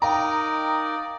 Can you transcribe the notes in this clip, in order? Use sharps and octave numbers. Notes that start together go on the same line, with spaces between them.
D#4 A#4 D5 D#5 F5 G5 A#5 D#6